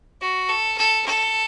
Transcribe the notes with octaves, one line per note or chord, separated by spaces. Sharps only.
F#4
A4
A4
A4